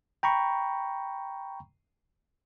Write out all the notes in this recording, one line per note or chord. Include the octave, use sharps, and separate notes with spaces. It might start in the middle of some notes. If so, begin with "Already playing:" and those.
G5 A#5 B5 C#6